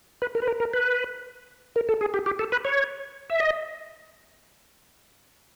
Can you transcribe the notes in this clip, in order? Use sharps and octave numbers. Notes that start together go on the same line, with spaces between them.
B4
A#4
B4
A#4
A#4
B4
A#4
A4
G#4
G4
G4
A4
B4
C#5
E5
D#5